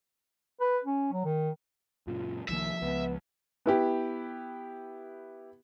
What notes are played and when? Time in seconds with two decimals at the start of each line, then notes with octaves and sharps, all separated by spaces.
0.61 B4
0.84 C#4
1.12 F#3
1.25 D#3
2.07 F#2 A#2 C#3 F4
2.49 C2 D#3 F3 A#3 E5
2.82 C#2 B3
3.66 B3 E4 G4